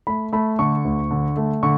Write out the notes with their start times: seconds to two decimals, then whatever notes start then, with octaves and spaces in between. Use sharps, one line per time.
0.07 A3 B5
0.33 A3 B5
0.59 D3 C#6
0.85 D2
1.11 D3
1.37 A3
1.63 D3 C#6